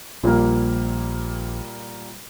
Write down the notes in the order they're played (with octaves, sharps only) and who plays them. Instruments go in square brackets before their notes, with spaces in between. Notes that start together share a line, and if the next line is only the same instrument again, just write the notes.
[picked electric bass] A#1 [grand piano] A#2 G3 A#3